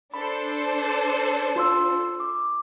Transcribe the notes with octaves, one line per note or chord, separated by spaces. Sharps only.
D4 A4 C5 B5
F4 C6 E6
D6